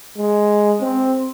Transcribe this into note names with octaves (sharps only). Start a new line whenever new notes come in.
G#3
C4